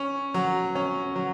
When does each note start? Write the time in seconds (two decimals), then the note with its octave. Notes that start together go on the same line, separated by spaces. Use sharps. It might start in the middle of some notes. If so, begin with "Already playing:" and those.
Already playing: C#4
0.34 F#3
0.75 C#4
1.16 F#3